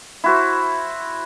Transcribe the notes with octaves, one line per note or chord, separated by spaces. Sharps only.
E4 F#4 C5